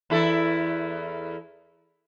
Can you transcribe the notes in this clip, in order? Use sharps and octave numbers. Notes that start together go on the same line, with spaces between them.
E2 E4 A4